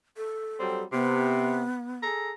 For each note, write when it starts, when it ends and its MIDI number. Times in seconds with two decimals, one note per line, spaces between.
0.17 0.83 69
0.60 0.84 54
0.60 0.84 55
0.60 0.84 60
0.93 1.61 48
0.93 1.96 59
2.02 2.32 68
2.02 2.32 69
2.02 2.32 82